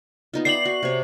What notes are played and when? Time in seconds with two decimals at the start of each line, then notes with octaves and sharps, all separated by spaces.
0.33 B3 D#4 F4
0.45 D5 E5 G5 C7 F#7
0.65 F#4
0.83 C3 C#5